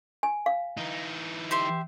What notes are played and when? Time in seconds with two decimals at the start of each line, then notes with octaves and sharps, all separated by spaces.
0.23 G#5
0.46 F5
0.77 E3 D#4
1.51 G4 E5 C6